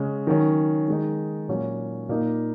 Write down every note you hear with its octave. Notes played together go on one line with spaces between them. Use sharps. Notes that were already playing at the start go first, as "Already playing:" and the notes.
Already playing: C#3 G#3 C#4
D#3 F#3 C#4
D#3 G#3 D#4
A#2 F#3 C#4
A#2 A#3 D#4